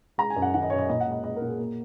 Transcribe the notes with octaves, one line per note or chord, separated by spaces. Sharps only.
G#3 A#5
G#5
F#2
F#5
D#3 F#5
D#5
F#2 C#5
D#5
A#2 D#5
F#5
G#3
D#5
G#3 D#5
A#4
A#2
G#4
A#3